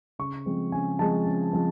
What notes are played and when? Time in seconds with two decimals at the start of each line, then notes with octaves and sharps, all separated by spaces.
0.19 C#3 C#6
0.46 F3 G#3 C4
0.72 C#3 G#5
0.99 F3 G#3 C4 A5
1.26 C#3
1.53 F3 G#3 C4